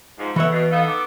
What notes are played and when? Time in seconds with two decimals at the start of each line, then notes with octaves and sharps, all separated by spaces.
0.18 G#2 F3
0.36 A2 E3 C#5 E5 F#5
0.52 B2
0.72 B3 D#4 A4 F5
0.87 D6